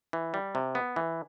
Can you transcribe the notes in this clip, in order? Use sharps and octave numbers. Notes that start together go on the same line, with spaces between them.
E3
G3
C3
B3
E3